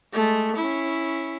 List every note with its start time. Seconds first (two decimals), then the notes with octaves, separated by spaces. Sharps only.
0.13 G#3 A3
0.56 C#4 E4